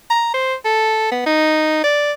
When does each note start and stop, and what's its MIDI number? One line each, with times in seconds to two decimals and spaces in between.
0.10 0.30 82
0.34 0.54 72
0.65 1.09 69
1.12 1.26 59
1.26 1.82 63
1.84 2.12 74